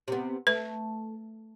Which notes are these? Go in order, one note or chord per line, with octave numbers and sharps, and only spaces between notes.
C3 B3
A3 B4